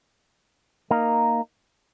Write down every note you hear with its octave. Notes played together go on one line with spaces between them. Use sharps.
A#3 D#4 A#4